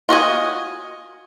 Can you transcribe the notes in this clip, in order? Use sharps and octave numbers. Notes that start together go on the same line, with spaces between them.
F4 F#4 D#5 G#5